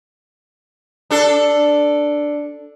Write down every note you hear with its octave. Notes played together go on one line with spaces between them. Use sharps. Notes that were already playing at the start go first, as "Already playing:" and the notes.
D4 A4